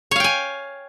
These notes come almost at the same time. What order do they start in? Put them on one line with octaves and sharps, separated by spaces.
C#5 F5 G5 G#5